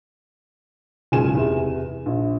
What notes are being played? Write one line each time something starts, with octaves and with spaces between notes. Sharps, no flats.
F#1 G#2 F4 G#5 E7
E2 C3
A#1